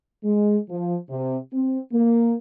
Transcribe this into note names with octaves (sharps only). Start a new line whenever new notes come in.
G#3
F3
C3
C4
A#3